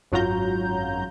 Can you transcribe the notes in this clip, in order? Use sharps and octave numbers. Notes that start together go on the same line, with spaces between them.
G#1 F#2 F#3 F4 A#5 G6